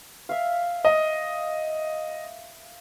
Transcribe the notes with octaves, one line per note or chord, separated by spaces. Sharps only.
E5 F5
D#5